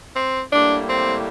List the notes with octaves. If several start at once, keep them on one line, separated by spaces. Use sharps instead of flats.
C4
A2 G3 A#3 D4
C4